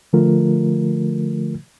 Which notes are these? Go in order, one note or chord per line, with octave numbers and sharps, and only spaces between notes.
D3 F3 A3 F4 A#4